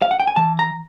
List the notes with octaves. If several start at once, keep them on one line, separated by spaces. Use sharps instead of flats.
F5
F#5
G5
G#5
E3 A5
A#5